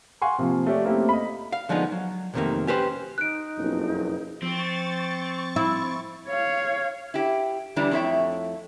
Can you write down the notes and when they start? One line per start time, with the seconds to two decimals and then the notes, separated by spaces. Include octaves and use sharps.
0.22 F5 F#5 G#5 C6 C#6
0.38 C3 F3 A#3
0.66 A3 G4 C#5 D5
0.85 A3 A#3 C4 C#4 E4 G4
1.09 D#5 B5
1.52 F5
1.69 D3 F3 G#3 B3 D#4
1.92 F#3
2.34 B1 F2 C3 D#3 A3 A#3
2.67 C#4 G4 B4 C5
3.18 D#4 F#6 D7
3.58 F#1 B1 F2
4.42 F3 C4 C#6 A6
5.56 E4
6.27 C#5 F5
7.14 E4 G4
7.76 D3 E3 G3 D4 E4 A#5
7.91 F2 A3 E4 C#5 E5 G5